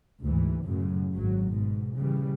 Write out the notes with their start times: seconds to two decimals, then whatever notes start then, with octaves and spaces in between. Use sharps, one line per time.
0.21 D2 G#2 E3
0.64 F#2 A2 C#3
1.13 G#1 F#3
1.48 G#2 B2
1.98 A#2 C#3 E3 G3